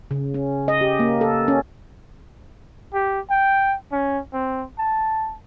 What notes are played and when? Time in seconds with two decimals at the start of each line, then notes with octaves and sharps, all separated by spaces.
0.11 C#3
0.34 C#4
0.68 D#5
0.81 G4
0.99 A#3
1.21 A4
1.48 C#4
2.94 G4
3.30 G5
3.92 C#4
4.33 C4
4.79 A5